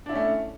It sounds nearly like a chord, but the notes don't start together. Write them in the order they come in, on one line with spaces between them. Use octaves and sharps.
D4 E4 C#4 A3